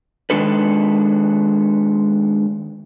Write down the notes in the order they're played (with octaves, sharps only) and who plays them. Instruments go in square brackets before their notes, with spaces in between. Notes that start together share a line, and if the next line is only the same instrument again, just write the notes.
[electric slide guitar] D#3 G#3 D4 A4 B4